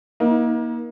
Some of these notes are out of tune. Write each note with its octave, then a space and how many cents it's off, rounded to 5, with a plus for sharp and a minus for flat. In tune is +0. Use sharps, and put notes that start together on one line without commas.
A#3 +30 D#4 +40